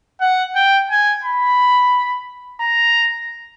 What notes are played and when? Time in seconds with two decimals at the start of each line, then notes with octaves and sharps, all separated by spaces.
0.20 F#5
0.55 G5
0.90 G#5
1.24 B5
2.61 A#5